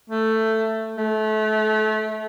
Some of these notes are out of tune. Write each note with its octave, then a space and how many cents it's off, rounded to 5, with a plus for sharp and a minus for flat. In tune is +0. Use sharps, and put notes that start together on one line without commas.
A3 +10
A3 -25